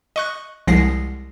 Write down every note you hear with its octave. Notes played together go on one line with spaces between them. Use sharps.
D#5 C#6 F#6
C2 F3 G#3 F#5 A#6 C7